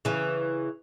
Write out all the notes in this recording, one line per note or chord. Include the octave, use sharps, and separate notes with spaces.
C#3 E3